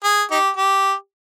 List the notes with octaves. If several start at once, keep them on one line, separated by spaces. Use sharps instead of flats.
G#4
D#4 G4
G4